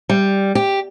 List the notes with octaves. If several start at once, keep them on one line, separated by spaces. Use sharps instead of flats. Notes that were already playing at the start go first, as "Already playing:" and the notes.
G3
G4